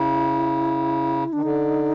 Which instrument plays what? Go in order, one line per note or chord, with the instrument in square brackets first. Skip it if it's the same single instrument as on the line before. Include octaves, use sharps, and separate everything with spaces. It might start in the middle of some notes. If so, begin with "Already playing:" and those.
Already playing: [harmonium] C#3 [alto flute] E4
[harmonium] D#3 [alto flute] D4
[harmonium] D3 [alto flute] D#4